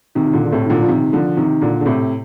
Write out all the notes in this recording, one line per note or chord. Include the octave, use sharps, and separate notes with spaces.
C3 D#3
D#3
A#2 D3
D3
A2 C3
D#3
A#2 D3
F3
C3 D#3
D3 F3
C3 D#3
A#2 D3
D3
A2 C3